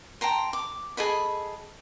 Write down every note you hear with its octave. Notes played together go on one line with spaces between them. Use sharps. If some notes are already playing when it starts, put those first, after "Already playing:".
G5 A5 A#5 C6
D6
G#4 A4 D#5 B5